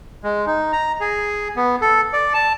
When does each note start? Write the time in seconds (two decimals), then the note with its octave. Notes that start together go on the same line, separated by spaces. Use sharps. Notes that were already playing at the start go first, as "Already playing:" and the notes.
0.24 G#3
0.46 D#4
0.73 A#5
1.00 G#4
1.56 B3
1.81 A4
2.13 D5
2.34 A5